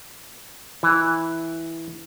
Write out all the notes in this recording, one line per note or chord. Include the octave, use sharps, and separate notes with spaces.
E3